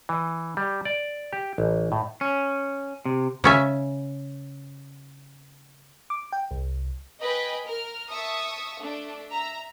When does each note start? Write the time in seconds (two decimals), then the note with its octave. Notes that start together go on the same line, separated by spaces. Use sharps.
0.09 E3
0.57 G3
0.85 D5
1.33 G4
1.58 A1
1.92 A2
2.21 C#4
3.05 C3
3.44 C#3 C#4 E5
6.10 D6
6.33 G5
6.51 C2
7.20 B4 D#5 G5 G#5 B5
7.64 A#4 F6
8.08 E5 A5 C#6 D#6
8.81 A3 D4
9.30 E5 A#5